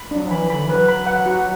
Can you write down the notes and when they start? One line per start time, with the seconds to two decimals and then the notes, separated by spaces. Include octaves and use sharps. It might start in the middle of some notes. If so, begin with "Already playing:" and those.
Already playing: B5
0.11 F#3 D4
0.31 E3 B5
0.50 D3 B5
0.69 F#3 B4
0.88 B5
1.06 F#5
1.26 F#4